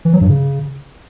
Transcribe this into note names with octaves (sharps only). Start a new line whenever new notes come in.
E3
F#3
G2
C#3